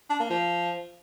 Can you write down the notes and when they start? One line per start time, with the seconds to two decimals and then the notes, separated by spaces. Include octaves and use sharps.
0.10 D4
0.20 A#3
0.30 F3